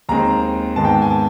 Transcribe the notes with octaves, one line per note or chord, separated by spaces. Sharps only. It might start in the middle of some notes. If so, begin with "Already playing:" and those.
D#2 D#3 G#3 C4 A#5
G#2 D#3 G#3 B3 A5
G5
G#5
A5